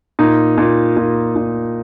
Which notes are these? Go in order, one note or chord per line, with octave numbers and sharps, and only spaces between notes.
A#2 D#4
A#2
A#2
A#2